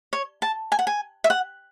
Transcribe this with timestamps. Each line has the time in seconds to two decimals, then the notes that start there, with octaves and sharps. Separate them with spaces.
0.13 C#5
0.42 A5
0.72 G#5
0.79 F#5
0.87 G#5
1.24 E5
1.30 F#5